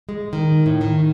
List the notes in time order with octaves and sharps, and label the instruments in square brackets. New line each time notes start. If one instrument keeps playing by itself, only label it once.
[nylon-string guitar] G#3
D#3
A2
D#3